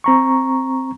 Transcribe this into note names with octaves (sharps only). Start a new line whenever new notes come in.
C4 A#5 C#6